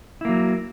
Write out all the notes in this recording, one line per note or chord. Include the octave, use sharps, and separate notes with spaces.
F#3 A#3 E4